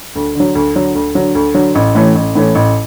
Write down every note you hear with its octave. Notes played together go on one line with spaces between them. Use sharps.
D2
D3 F#3
D2
D3 F#3
D2
D3 F#3
D2
D3 F#3
A1
A2 E3 A3 C#4
A1
A2 E3 A3 C#4
A1